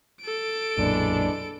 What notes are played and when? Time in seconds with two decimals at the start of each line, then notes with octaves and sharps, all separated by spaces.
0.21 A4 D7
0.78 B1 F#2 A#2 E3 G#3 D4